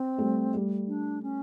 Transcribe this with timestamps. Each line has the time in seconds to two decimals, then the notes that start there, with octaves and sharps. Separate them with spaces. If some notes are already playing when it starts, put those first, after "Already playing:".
Already playing: C4
0.18 G3 A3
0.54 G3 A3
0.88 D4
1.23 C#4